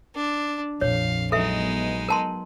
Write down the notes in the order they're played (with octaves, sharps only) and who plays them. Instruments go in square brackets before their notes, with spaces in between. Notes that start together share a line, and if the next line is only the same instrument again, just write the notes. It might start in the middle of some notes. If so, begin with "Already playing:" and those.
[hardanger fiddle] D4
[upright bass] A#1 [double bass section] F2 [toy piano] C#5 [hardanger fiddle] F5
[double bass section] F#3 B3 [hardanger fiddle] G#3 D#4 [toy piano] A4 E5
[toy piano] A#4 A5 C6